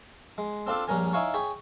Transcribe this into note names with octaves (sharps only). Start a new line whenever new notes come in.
G#3
C4 D4 F4 A4 D5 F5
A#1 G2 C#4 A#4 G#5
D#4 E4 C#5 F5 G#5 C#6
G#4 C#5 G5 B5